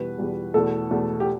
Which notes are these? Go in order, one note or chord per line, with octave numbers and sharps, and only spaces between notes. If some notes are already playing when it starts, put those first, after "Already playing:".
Already playing: E2 B2 G3 B4
E2 B2 G3
E2 B2 A3 A4
E2 B2 A3
G4